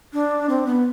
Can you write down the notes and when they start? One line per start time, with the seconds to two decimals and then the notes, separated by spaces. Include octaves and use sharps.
0.13 D4
0.49 C4
0.67 B3